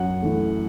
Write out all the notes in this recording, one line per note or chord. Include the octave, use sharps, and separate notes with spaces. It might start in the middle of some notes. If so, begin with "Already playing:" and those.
Already playing: F#2 F#5
E3 A3